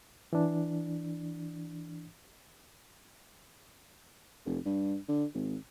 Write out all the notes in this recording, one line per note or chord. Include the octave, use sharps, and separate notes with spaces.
E3 D4
F1
G2
D3
G#1